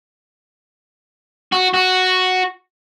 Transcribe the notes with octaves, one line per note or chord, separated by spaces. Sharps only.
F#4
F#4